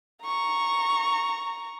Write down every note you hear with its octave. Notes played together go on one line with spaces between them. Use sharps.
A#5 C#6